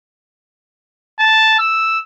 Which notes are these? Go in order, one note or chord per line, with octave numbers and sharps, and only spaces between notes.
A5
E6